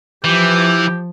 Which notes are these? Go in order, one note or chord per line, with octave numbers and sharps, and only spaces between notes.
E3 F3 G4